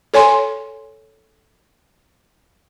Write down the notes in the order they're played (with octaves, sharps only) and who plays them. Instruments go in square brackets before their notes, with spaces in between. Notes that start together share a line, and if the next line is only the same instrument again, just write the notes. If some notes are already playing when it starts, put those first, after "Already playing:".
[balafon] A4 C#5 G#5 C6